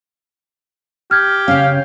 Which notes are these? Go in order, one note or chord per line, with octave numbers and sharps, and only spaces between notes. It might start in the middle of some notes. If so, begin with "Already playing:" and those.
G4 F6 G#6
C#3 C#4 F5